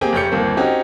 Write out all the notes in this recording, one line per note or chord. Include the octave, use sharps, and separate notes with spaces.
A#3 C4 G4 G#4 G5 G#5
F1 G4 C#5 G6 C#7
G1 D#2 A#3 C4
C4 C#4 D#4 F#4 G4